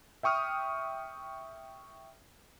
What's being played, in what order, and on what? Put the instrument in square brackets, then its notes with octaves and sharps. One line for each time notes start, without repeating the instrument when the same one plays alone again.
[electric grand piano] E5 G5 C#6 D#6 F6